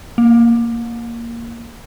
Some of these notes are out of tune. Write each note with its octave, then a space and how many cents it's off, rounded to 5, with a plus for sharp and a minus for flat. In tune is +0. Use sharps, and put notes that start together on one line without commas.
A#3 +0